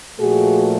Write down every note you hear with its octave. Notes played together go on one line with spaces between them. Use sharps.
A#2 F3 A3 F#4 G#4